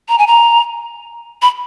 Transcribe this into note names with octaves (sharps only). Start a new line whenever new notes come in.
A#5
G#5
A#5
B5